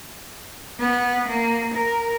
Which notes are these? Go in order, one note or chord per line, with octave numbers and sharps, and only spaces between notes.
B3
A#3
A#4